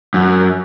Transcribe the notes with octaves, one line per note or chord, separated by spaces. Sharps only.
F#2